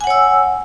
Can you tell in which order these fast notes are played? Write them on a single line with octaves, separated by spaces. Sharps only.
G#5 F#5 C#5 E6